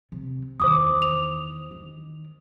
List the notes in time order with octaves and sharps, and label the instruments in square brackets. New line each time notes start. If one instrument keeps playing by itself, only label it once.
[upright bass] C3
[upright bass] E2 D#3 [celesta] C5 D6 D#6
[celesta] F7
[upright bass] D#3